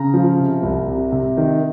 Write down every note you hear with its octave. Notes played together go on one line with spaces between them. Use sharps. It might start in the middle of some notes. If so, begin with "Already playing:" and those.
Already playing: C#3 A#5
F3
C3
C2
C3
C3
D#3